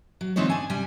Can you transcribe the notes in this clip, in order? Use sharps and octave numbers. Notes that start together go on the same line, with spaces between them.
F#3
D3 E3 C4 D#4 F4 C#5
D4 G#5
C3 G3 G#5